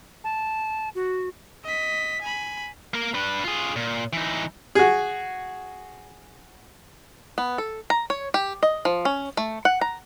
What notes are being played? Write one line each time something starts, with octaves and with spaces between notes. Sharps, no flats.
A5
F#4
D#5 B6
G#5 B5
A#3 A#4
D4 B4
F4 G#4
A#2
E3 D#4
F#4 G#4
B3
A4
A#5
C#5
G4
D#5
F3
C#4
A3
F#5
A#5